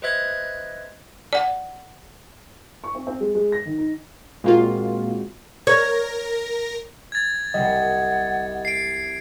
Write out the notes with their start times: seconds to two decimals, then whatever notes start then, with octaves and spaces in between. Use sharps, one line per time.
0.02 B4 C5 D#5 E5 F#6 G#6
1.33 D5 F#5
2.84 C#6
2.95 C4
3.07 C4
3.20 G#3
3.35 G#3
3.52 A#6
3.66 D#3
3.78 D#4
4.44 A#2 G#3 A#3 C4 F4 F#4
5.67 A#4 C#5 A#6
7.12 G#6 A6
7.54 C2 G3 D#5 F#5
8.65 C7 D7